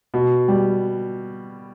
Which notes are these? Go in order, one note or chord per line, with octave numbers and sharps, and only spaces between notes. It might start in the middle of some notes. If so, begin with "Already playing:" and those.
B2
G3